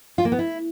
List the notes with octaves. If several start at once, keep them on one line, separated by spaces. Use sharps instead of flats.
F4
A#3
B3
E4